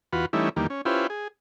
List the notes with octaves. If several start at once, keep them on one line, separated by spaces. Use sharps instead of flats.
E2 F4 F#4 B4
E3 G3 A3 C#4 D#4 E4
E2 D#3 G3 A#3
C#4
C#4 E4 F4 G4 B4 C5
G#4